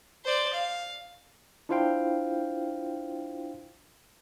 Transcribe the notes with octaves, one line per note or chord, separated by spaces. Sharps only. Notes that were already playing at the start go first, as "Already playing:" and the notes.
C5 D5
F5
D4 E4 F4 C5 F5 G5